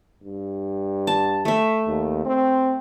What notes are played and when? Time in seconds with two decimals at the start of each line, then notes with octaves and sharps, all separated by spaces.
0.23 G2
1.07 A5
1.45 A3 E5
1.86 D#2
2.25 C4